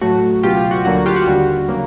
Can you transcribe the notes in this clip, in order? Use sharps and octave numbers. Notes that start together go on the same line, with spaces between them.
A2 F#3 A3 F#4
C#2 B2 F#3 F4 G4
F4
F#4
D2 D3 F#3 A#3 F#4
F4 G4
F#4
D#2 D3 G3
C#3 F#3 A#3